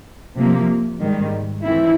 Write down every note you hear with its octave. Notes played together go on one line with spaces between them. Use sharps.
C3 F3 A#3
G#2 D#3 G3
E3 A3 C4 E4